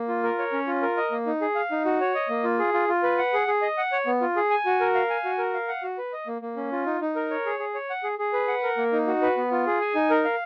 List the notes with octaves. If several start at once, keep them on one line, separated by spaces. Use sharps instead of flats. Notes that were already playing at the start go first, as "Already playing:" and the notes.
Already playing: A#3
F4
A#4
C#5
C#4
F4
A#4
D#5
A#3
D#4
G#4
F5
D#4
F#4
C#5
D#5
A#3
F4
G#4
F4
F4
B4
F#5
G#4
G#4
D#5
F#5
C#5
B3
F4
G#4
G#5
F#4
A#4
F5
G#5
F#4
A#4
F5
F#5
F#4
B4
D#5
A#3
A#3
C#4
F4
D#4
D#4
A#4
C#5
G#4
G#4
C#5
F#5
G#4
G#4
B4
F#5
A#4
A#3
D#4
F#4
B4
B3
F4
G#4
G#5
D#4
A#4
F5